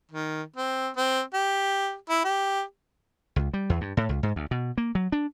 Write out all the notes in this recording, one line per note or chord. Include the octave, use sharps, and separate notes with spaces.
D#3
C4
C4
G4
E4
G4
C#2
G3
E2
G2
A2
C#2
G#2
D2
B2
A#3
F#3
D4